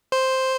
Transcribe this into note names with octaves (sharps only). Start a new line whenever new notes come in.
C5